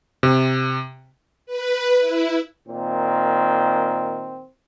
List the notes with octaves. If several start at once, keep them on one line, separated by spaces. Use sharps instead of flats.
C3
B4
E4
A#2 D#3 C4